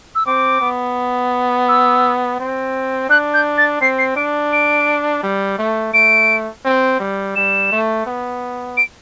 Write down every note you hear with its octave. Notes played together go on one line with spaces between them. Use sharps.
E6
C4 D6
B3
E6
C4
D4 F#6
G6
A6
C4 C7
C7
D4 D7
D7
G3
A3
A3 D7
C4
G3
G3 E7
A3
B3
D7